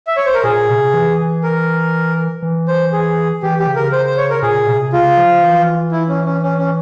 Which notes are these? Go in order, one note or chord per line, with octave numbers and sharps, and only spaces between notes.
E5
C#5
C5
A#4
A#2 G#4
C3
E3
A#4
E3
C5
G#4
E3 G4
G4
C#3
A#4
C5
C5
C#5
A#4
A#2 G#4
C3
C#3 F4
F3
E3
E4
C#4
C#4
C#4
C#4